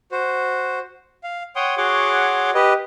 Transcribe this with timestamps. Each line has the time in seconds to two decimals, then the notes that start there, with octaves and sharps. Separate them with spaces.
0.12 F#4 C5
1.23 F5
1.56 C#5 F#5 G5 C6 D#6
1.77 F#4 G#4 C#5 F#5 C6 D6
2.54 G4 B4 D#5